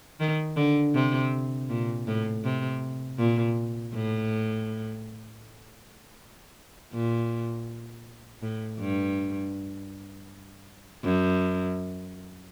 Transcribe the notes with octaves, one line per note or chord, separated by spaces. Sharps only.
D#3
D3
C3
A#2
A2
C3
A#2
A2
A#2
A2
G2
F#2